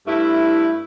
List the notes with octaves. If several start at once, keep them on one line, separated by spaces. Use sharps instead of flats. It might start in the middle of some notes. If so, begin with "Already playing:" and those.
G2 A3 E4